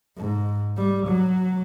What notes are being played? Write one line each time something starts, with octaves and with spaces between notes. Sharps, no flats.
G#2
G3
F#3